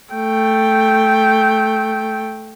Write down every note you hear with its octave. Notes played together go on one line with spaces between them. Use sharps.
A3 G5